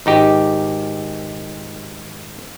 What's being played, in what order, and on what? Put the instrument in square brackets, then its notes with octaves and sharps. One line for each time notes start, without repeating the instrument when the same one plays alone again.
[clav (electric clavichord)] G#1 D#4 G4